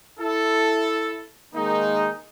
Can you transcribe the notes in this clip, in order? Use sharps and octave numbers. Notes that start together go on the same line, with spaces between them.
E4 A4
D#3 G#3 A#3 D#4